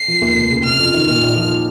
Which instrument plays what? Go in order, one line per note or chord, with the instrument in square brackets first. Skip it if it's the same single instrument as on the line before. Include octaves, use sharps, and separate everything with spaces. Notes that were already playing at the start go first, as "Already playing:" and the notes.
Already playing: [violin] C7
[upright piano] F3
D#2
F1
C#3
[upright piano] C3 [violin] F6
[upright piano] F2
D#3
[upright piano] A#2 [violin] F6
[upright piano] A#1
F3